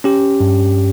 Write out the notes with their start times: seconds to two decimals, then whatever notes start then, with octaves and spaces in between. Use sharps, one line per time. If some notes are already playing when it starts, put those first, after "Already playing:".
0.04 C#4 G4
0.40 G2